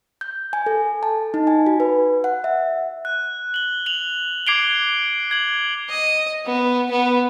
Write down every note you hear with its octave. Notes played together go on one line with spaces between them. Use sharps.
G6
G#5
A4
A5
D#4
G#5
F#4
B4
F#5
E5
F#6
F#7 G7
F7 F#7
D6 G#6 C7 D7 F7 G7
G#6 F#7
D#5
B3
B3